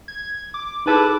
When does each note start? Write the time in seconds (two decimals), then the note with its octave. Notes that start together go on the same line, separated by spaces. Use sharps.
0.08 G#6
0.54 D6
0.86 D#4 E4 G#4 A4 B4